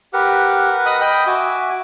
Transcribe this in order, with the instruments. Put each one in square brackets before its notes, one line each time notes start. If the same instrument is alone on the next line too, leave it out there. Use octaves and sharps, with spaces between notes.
[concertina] G4 [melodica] A#4 B4 F#5
[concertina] D#5 B5 D#6
D#5 G5 B5
[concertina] F#4 [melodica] E5 G#5 D6